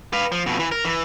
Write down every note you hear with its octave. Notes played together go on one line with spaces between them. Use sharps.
B4 F5
F3
F2 B2
E3
A#4
E3